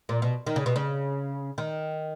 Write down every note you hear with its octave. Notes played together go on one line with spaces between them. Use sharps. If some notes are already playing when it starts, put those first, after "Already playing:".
A#2
B2
D#3
C#3
B2
C#3
D#3